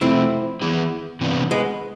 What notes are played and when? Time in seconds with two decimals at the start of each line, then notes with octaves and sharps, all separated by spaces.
0.01 C3 F3 A3 C4 E4
0.62 E3 B3 E4 G#4
1.21 C3 E3 B3 D4
1.51 G#3 B3